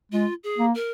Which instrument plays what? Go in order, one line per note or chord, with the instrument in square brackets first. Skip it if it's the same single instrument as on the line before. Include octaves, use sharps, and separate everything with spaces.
[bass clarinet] G#3 [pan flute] F4
[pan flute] G#4
[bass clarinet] A#3
[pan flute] A#4